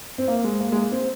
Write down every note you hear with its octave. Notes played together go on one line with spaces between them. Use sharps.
C4
A#3
G#3
A#3
G#3
A#3
C4